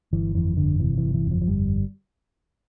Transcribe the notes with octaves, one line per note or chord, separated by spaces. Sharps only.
G1 E3
F2 E3
G1 D3
C3 E3
G1 E3
E3
F2
F3
F3
G1 G3